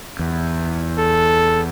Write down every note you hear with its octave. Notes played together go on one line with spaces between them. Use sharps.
E2
A4